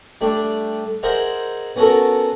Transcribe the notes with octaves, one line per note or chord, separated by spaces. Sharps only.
G3 A3 D4
G#4 A#4 C5 D#5 E5 F#5
B3 C#4 F#4 A4 A#4